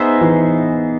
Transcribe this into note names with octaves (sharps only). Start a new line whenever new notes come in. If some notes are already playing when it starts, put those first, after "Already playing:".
Already playing: B3 D#4 G#4 C5 E5
E3